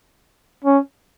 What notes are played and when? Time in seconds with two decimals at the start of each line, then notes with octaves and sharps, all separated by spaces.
0.64 C#4